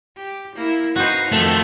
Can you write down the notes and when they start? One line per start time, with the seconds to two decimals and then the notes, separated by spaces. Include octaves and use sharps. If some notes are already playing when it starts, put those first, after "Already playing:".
0.17 G4
0.56 A#3 E4
0.96 D#4 F#4 B4 C5
1.32 F2 D#3 F3 A3